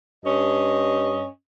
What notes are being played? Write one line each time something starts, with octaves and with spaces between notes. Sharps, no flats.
G2 C#4 D#5